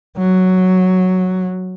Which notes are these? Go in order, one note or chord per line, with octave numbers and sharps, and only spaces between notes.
F#3